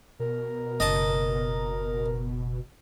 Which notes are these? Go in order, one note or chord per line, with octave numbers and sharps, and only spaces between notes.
B2 A#4
F#1 D#5 A5